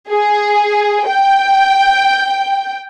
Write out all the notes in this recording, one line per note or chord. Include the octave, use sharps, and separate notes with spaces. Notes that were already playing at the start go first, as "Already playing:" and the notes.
G#4
G5